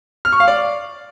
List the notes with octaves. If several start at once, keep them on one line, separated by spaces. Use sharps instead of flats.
F6
C#6
F5
D5